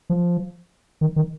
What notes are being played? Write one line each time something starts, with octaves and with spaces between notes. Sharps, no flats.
F3
D#3
D#3